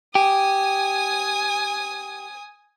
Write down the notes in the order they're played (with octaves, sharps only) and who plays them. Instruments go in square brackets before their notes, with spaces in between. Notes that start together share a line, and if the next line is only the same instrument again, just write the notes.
[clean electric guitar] G4 [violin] G#5 D#6